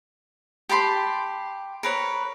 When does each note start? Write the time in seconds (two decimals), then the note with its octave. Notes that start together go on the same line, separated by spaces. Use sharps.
0.69 G4 A5 B5 C6
1.83 A#4 B4 C#5